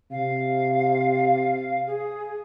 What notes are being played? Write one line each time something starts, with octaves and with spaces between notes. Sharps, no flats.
C3 F5
G#4